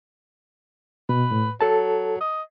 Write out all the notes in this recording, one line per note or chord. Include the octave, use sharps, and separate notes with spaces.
B2 B4
A2
F#3 A4 A5
D#5